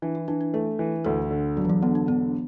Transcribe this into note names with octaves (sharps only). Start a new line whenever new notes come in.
E3 D4
E4
E3 D4
D4
A3 B4
E3
D2 A4
D3
E1 F#3
E3
F#3
D3 B3
D4
E1 B3